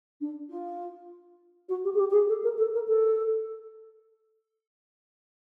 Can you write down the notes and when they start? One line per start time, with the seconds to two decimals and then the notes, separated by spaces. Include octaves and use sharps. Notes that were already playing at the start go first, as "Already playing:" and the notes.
0.21 D4
0.49 F4
1.69 F#4
1.84 G4
1.94 G#4
1.99 G4
2.10 G4
2.13 G#4
2.28 A4
2.43 A#4
2.58 A4
2.74 A#4
2.87 A4